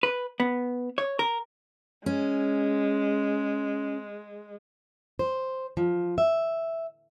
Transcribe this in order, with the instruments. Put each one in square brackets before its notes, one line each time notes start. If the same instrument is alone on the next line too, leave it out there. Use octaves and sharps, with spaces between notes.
[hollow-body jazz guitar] B4
B3
C#5
A#4
[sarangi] G#3 [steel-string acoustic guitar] C#4
[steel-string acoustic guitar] C5
F3
E5